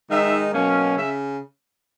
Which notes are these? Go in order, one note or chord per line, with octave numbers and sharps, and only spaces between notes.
D#3 G#3 D#4 E5
B2 F#3 A#3 C#4
C#3 E5